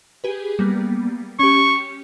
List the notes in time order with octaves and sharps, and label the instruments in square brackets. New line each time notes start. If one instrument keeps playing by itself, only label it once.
[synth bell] G4 G#4 B4
G3 A#3 B3
[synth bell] C#4 G4 [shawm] C#6